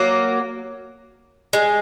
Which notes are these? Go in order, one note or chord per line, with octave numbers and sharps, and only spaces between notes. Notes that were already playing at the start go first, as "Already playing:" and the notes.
Already playing: F#3 A#3
G#3